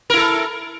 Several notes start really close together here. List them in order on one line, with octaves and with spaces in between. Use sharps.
A#4 E4 A4